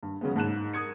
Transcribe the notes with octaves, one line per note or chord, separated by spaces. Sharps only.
G2
C#3 F#3 G#3 B3
G#2 A5 F#6 E7
A#4 D#6 G#6 C#7